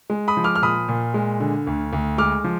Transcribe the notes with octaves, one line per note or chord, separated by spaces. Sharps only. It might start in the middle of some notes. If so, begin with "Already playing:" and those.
G#3
B5 D#6
F3
D6 F6
F6
A#2 B5 D#6
A#2
G#3
D3
D2
D2
G#3 D6 F6
F3